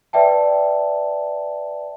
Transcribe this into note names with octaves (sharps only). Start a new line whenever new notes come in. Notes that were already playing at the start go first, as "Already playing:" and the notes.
B4 D5 E5 G5 A5